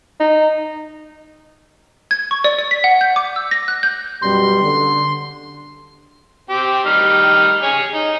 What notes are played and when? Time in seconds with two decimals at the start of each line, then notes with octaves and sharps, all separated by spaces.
0.20 D#4
2.11 G#6
2.31 C#6
2.44 D5
2.59 D5
2.71 B6
2.84 F#5
3.01 G6
3.16 D6
3.36 E6
3.51 A#6
3.68 F#6
3.83 G6
4.22 F#2 B2 G3 C6
4.61 D3
6.50 C4 G4
6.86 G3 D#4 F6
7.63 G#4 C#5
7.94 D#4